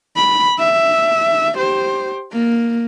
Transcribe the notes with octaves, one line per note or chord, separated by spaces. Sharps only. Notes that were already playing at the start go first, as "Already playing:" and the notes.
B5
E5
G4 C5
A#3